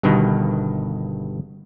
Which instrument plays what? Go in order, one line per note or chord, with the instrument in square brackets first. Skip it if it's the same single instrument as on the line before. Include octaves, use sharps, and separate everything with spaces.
[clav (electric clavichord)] G1 G2 B2 D#3